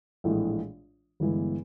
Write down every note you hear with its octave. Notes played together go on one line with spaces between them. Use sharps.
A#1 A2 E3 G#3
G1 G2 E3 G#3 B3